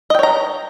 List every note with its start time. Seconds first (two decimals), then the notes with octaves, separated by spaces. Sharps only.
0.10 D#5
0.15 G5
0.19 C#5
0.23 A#5